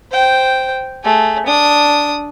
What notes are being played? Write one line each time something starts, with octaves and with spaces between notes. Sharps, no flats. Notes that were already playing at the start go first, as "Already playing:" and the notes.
C5 G5
A3 G#4
D4 D#6